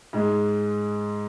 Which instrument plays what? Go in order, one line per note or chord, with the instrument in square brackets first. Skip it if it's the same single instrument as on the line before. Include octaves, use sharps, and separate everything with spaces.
[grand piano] G#2 G#3